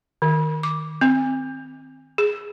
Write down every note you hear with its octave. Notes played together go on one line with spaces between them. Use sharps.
D#3
D6
C4
G#4